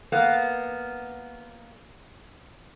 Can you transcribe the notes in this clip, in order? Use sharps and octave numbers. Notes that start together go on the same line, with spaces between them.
A#3 B3